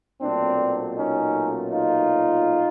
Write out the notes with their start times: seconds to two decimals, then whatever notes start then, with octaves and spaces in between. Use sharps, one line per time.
0.21 B1 A#2 F#3 A3 C4 D4
0.96 C#4 D#4
1.70 D#4 F4